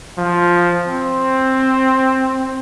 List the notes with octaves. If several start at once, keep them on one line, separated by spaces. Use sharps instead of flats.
F3
C4